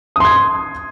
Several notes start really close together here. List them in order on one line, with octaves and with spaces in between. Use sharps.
D#6 C6 G#6